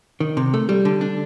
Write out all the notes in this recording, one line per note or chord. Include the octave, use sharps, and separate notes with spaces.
D#3
C3
A3
G3
D3
D4